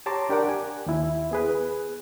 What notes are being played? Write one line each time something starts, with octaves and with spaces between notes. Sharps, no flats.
G4 C#5 A5 A#5 C6 D6
D4 G4 A#4 D5 F#5 D6
G#5
D#2 E4
B3 G#4 B4